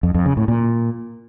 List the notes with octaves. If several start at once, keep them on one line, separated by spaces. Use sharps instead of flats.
F2
F2
C#3
A2
A#2